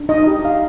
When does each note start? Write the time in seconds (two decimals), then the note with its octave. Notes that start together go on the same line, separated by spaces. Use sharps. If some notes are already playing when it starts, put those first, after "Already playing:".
Already playing: D4
0.09 D#4 D#5
0.27 G4
0.44 D#4 F5